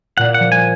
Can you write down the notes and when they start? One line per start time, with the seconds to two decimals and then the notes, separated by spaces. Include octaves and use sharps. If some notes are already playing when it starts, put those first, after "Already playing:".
0.18 A#2 F#5
0.34 F#5
0.40 F3
0.52 G#5